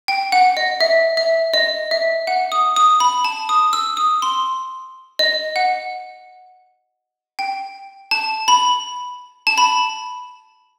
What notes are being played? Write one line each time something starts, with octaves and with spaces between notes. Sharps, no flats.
G5
F#5
D#5
E5
E5
D#5
E5
F#5
D#6
D#6
B5
A5
D#6
E6
D#6
C6
D#5
F#5
G5
A5
B5
A5
B5